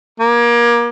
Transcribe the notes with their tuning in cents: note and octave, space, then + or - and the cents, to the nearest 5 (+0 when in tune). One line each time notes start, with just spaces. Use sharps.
A#3 +30